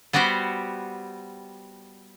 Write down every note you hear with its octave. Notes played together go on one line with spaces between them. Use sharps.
G3 B3 F#4 G4 C5